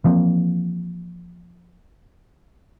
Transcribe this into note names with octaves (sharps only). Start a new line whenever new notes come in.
E3 F3 A#3 C4